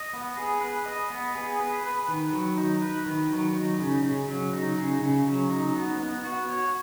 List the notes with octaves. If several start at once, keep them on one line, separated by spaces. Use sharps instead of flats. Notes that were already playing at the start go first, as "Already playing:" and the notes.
Already playing: D#5
B3
G#4
B4
D#5
B3
G#4
B4
B4
D#3
F#3
D#4
B4
D#3
F#3
D#4
C#3
C#3
F#3
D#4
C#3
C#3
F#3
D#4
B3
B3
F#4
C#5